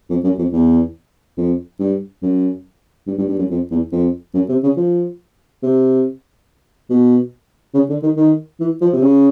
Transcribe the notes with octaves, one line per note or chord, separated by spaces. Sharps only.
F2
F#2
F2
E2
F2
G2
F#2
G2
G2
G2
F#2
F2
E2
F2
F#2
C3
C#3
F3
C3
B2
C#3
D3
D#3
D#3
E3
F3
C3
C#3